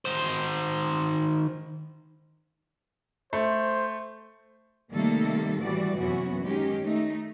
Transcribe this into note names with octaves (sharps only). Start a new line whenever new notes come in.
D#3 C5
A3 C5
C3 D#3 G3 A3 A#3 A4
A2 E3 G3 F#4 D5
F#2 C3 E3 B3 C#4 F#4
D#3 G#3 C#4 D#4 G4
A3 D#4